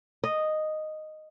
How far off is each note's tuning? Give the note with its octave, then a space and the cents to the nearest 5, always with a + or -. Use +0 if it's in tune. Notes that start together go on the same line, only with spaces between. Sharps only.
D#5 -5